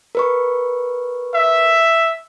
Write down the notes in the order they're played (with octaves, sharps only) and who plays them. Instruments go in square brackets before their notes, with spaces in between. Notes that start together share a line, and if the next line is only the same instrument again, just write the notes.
[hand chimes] A#4 B4 C#6
[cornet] E5